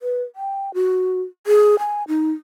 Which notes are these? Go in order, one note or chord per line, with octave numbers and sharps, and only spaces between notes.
B4
G5
F#4
G#4
G#5
D#4